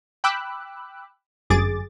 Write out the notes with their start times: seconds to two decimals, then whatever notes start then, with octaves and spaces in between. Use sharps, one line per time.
0.24 G5 B5 D6 E6 F#6
1.50 G1 F#2 G#4 D6 A6